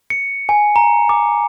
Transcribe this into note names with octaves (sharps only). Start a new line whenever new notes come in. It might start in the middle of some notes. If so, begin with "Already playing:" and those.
C#7
G#5
A#5
D6